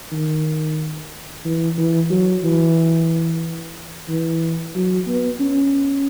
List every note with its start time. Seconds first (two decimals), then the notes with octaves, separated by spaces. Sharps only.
0.12 D#3
1.45 E3
1.78 E3
2.11 F#3
2.44 E3
4.08 E3
4.75 F#3
5.07 B3
5.40 C#4